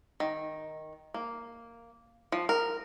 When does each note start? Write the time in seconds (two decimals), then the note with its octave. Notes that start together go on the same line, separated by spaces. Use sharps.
0.20 D#3
1.14 A#3
2.32 F3
2.49 A#4